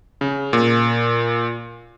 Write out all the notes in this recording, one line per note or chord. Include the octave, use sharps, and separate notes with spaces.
C#3
A#2